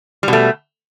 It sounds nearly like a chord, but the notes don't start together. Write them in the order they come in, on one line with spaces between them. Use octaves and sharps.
G3 B2 A3